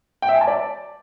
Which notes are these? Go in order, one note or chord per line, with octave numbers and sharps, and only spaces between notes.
G5
E5
G#5
A5
D5